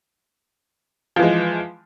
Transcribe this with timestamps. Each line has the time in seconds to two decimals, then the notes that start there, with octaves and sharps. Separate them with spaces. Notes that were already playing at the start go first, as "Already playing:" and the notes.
1.16 F3
1.19 E3
1.23 G#3